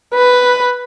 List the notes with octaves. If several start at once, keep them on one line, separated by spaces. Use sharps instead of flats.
B4